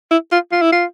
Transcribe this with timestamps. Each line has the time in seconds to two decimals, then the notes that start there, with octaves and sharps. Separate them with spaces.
0.11 E4
0.32 F4
0.52 F4
0.62 E4
0.72 F4